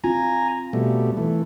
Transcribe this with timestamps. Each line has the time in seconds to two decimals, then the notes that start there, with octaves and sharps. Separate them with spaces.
0.04 C4 F4 G#5 A#5
0.73 B2 G3 A3
1.17 E3 A3